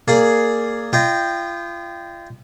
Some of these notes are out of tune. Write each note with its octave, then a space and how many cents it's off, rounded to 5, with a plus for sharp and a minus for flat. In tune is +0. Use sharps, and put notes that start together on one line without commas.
A#3 -15 G#4 +5 D5 +0
F4 -35 D#5 -40 G5 +0